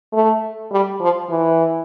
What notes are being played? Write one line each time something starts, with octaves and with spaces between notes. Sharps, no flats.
A3
G3
F3
E3